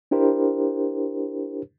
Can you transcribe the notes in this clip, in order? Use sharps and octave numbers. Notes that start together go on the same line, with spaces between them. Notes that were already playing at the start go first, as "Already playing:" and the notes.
D4 E4 G4 A#4 C5